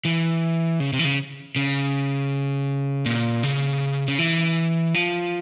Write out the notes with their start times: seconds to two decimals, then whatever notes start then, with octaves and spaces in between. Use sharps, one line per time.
0.05 E3
0.80 C#3
0.93 C3
0.99 E3
1.05 C#3
1.56 C#3
3.06 A#2
3.43 C#3
4.08 C#3
4.19 E3
4.95 F3